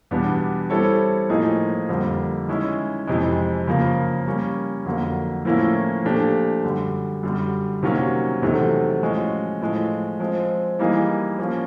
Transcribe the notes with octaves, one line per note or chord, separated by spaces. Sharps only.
E2 B2 G3 B3 D4
G3 C4 E4 A4 C#5
A2 F3 A#3 D#4 G#4
F2 D3 G3 A#3
D#3 G#3 C#4 E4
F2 C3 E3 G#3
F#2 C#3 F3 A#3
G3 A#3 C#4
F2 D3 F#3 A#3
A2 F3 A#3 C#4 E4
A#2 F3 A3 D4 G4
F#2 D3 G3
F#2 D3 G3
C3 D#3 F#3 A#3 C#4
E2 C3 D#3 F#3 A3
A2 F3 G#3 C#4 F#4
A2 F3 G#3
F3 G#3 C4
E3 G3 A#3 D#4 G#4
F3 A#3 C#4